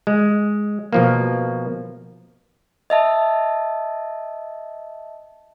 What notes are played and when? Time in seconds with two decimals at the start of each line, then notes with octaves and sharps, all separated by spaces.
0.07 G#3
0.93 B2 F3 A#3
2.90 D#5 E5 A5